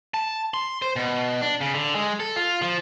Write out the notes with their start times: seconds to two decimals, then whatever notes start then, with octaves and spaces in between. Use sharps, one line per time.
0.14 A5
0.54 C6
0.82 C5
0.96 B2
1.41 D4
1.61 C#3
1.74 D3
1.95 G#3
2.20 A4
2.36 F4
2.62 F3